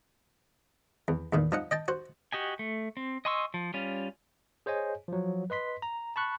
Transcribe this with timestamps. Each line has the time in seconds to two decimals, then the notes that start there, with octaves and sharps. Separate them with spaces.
1.08 E2
1.33 E2 A#2 D#3
1.52 F3 D#4 F#5
1.71 D#5 G5 A5
1.88 F#4 C5
2.33 F#4 G4 D#5 G#5
2.59 A3
2.97 C4
3.25 D#5 G#5 C6 C#6 E6
3.54 F3
3.74 G3 C#4 F4
4.66 G#4 C5 C#5 D#5 G#5
5.08 F3 F#3
5.50 B4 D#5 C6 B6
5.82 A#5
6.16 A5 B5 C#6 F#6